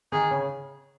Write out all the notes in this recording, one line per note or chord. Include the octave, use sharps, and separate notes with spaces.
D#3 D#4 G#4
C#3 C#4